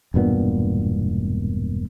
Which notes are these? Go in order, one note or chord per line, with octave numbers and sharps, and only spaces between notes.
E1 G2 A#2 B3